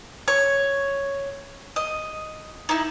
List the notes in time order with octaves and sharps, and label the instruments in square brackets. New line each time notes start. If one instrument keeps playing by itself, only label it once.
[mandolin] C#5
D#5
D#4 E4